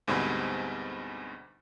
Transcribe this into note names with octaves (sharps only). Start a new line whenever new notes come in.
D2 G#2 B2 G3 C4 B5